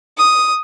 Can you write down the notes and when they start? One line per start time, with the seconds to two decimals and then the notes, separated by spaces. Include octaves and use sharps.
0.18 D#6